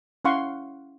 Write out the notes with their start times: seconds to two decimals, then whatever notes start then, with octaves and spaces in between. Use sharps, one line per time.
0.25 C#4 E4 F5 F#5 C6 C#6